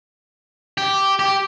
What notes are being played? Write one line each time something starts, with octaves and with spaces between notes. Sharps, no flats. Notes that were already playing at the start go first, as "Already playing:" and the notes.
G4
G4